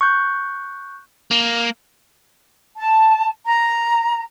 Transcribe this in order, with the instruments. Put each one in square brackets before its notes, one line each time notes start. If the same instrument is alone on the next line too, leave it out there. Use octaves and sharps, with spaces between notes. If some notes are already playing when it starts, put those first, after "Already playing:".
[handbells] C#6 F#6 G6
[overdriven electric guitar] A#3
[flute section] A5
A#5